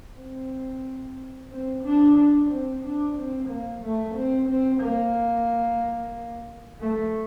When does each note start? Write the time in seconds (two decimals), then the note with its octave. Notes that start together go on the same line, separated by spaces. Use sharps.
0.18 C4
1.51 C4
1.84 D4
2.18 D4
2.50 C4
2.84 D4
3.17 C4
3.49 A#3
3.82 A3
4.15 C4
4.49 C4
4.82 A#3
6.80 A3